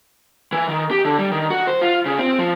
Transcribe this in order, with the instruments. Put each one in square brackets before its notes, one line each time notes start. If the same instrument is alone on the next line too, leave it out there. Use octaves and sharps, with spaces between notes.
[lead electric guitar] E3
D#3
G4
D3
G3
D#3
F#4
C5
F4
C#3
C4
F3